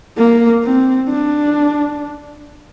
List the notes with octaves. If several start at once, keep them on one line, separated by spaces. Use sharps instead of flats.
A#3
C4
D4